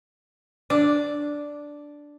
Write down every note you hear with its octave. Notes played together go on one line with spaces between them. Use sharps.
D4